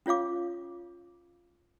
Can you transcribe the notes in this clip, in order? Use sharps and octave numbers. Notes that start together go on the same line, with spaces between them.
C#4 F4 C#5 F5 D6